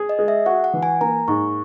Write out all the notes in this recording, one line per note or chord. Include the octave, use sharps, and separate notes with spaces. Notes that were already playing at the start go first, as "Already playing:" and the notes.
Already playing: G#4
D#5
G#3
E5
F#4 F#5
F#5
E3
G#5
A#3 A#5
G#2 C#6